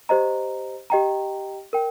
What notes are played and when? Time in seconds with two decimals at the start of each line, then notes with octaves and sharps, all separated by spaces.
0.09 G4 C5 D#5 A#5
0.90 G4 D#5 G5 A#5
1.73 A#4 G5